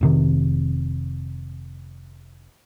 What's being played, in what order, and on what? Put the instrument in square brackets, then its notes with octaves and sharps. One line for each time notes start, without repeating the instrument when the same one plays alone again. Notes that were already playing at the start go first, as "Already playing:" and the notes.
[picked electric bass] F1 C3 D#3